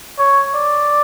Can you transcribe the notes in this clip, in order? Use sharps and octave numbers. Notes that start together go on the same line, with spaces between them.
C#5
D5